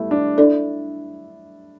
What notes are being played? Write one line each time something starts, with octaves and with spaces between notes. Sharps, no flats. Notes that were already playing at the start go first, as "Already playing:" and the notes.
Already playing: G3 A3 B3 E4
D4
D4 E4 A4 D5